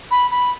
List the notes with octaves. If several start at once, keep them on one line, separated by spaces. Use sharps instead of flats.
B5
B5